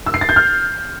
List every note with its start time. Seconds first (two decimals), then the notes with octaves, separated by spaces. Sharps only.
0.06 E6
0.14 C7
0.21 A6
0.29 G6
0.36 F6